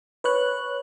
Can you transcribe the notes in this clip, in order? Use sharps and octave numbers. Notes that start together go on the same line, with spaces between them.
B4 C#5 F#6